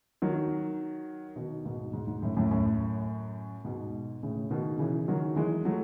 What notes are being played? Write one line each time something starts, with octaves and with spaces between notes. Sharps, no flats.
D#3 F#3
B2 D#3
G#2 B2
G#2
G#2
F#2 A2
F#2 A2
F#2 A2
G#2 B2
A2 C#3
B2 D#3
C#3 E3
D#3 F#3
E3 G#3
F#3 A3